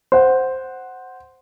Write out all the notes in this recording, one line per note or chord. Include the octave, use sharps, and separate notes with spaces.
C5 F#5